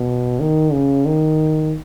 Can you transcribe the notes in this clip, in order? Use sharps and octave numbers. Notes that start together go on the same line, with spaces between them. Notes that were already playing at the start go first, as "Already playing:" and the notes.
Already playing: B2
D#3
C#3
D#3